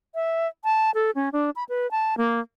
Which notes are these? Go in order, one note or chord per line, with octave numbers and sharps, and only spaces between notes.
E5
A5
A4
C#4
D4
B5
B4
A5
A#3